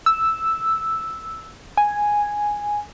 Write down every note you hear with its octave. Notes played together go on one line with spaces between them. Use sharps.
E6
G#5